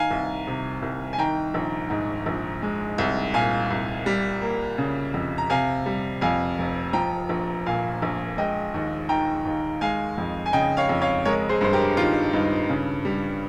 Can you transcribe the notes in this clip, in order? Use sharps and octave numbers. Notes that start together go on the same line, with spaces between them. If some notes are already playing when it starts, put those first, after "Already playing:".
Already playing: D#3 F5 G#5 A#5
C2
C3
C2
G#5
D#3 G5 A#5
A#1
G#2
A#1
G#3
C2
A#2 F5 G#5
C2
G3
A#3
C#3
F2
A#5
C3 F5 G#5
G3
F2 F5 G#5
F1
F3 G5 A#5
A#1
A#2 F5 G#5
A#1
G#3 D#5 G5
D#2
D#3 G5 A#5
D#2
G#3 F5 G#5
F2
G#5
C#3 D#5 G5
C#5 F5
F2
C#5 F5
G#3 A#4 C#5
G#4 C5
G2 C5
G4 A#4
D#3 F4
G2 D#4
C#3
G3